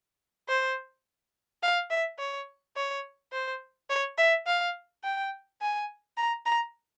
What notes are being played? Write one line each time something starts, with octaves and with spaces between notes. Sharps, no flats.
C5
F5
E5
C#5
C#5
C5
C#5
E5
F5
G5
G#5
A#5
A#5